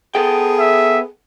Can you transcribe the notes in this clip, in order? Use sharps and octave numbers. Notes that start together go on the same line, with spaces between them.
B3 G#4 A4 G5
E5